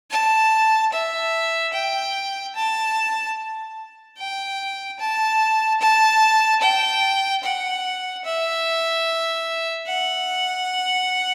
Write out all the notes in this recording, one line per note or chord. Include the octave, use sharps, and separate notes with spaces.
A5
E5
G5
A5
G5
A5
A5
G5
F#5
E5
F#5